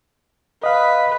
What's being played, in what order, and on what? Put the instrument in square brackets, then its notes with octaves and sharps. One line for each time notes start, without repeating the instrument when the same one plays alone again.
[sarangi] B4 [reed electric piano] D#5 F5